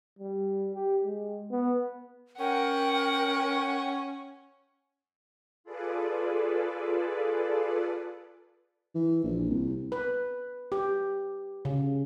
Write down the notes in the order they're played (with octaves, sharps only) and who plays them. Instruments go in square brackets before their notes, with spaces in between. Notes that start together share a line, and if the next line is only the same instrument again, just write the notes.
[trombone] G3
G4
G#3
B3
[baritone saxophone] C#4 [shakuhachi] A#4 [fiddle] F#5 [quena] G5
[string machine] F4 G#4 A4 B4 D5
[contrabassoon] E3
A#1
C2
[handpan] B4
G4
C#3